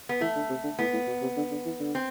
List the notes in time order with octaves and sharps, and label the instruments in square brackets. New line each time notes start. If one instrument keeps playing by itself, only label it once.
[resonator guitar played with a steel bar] B3
[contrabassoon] E3 [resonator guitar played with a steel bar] A3
[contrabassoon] D3
C3
D3
[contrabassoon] A2 [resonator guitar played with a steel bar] B3
[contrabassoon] A2
B2
C3
D3
D3
E3
D3
[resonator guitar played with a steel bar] C4